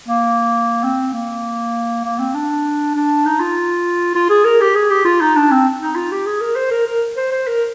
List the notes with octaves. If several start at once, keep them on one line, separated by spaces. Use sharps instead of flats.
A#3
C4
A#3
A#3
C4
D4
D4
D#4
F4
F4
G#4
A#4
G4
G#4
G4
F4
D#4
D4
C4
D#4
F4
G4
G#4
A#4
C5
A#4
A#4
C5
C5
A#4